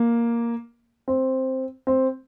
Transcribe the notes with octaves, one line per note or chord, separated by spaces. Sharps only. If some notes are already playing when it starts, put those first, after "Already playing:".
Already playing: A#3
C4
C4